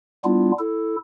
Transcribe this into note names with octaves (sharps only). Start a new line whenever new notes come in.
G3 B3 D4 E4 F4
E4 A4